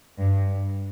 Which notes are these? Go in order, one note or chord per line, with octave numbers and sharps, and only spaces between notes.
G2